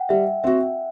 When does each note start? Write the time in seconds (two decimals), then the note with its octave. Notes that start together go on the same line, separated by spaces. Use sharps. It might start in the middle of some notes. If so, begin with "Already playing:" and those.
Already playing: F#5 G5
0.09 G3 E5
0.44 C4 F#4 E5